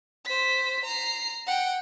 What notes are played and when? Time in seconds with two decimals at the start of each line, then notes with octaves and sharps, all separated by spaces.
0.25 C5 B6
0.84 A#5 C7
1.47 F#5 G5